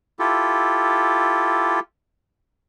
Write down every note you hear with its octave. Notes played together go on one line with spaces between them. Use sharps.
E4 F4 G4 A4